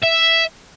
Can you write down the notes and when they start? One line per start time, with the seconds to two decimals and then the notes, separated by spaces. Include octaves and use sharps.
0.03 E5